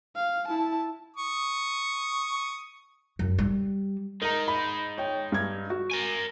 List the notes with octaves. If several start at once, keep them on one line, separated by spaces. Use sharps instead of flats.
F5
E4 A5
C#6 D#6
F#2
G3
G#3 D#4 A#4 A#5
B5
C#5 G5
G2 G#6
F#4
A#4 G#5